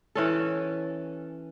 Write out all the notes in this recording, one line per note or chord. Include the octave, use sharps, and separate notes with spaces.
E3 C#4 A4